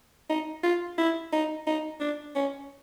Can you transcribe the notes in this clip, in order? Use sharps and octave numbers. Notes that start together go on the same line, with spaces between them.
D#4
F4
E4
D#4
D#4
D4
C#4